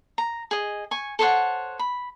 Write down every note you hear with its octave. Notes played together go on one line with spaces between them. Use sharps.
A#5
G#4 D#5
G#5 C#6
A4 C5 C#5 F#5
B5